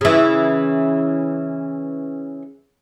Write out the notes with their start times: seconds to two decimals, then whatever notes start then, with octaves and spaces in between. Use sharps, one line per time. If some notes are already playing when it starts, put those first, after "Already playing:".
0.01 C#3 E3